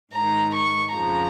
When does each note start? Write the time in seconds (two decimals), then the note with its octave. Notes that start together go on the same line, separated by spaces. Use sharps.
0.13 G#2 A#5
0.18 D#3
0.55 C#6
0.94 F2 C#3 F3 A#5